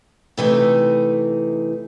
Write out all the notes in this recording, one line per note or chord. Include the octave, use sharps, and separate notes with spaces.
C3 E3 A3 D#4